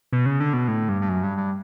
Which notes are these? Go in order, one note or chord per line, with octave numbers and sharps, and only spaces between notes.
B2
C#3
D3
B2
A2
G2
G2
F#2
G2
G2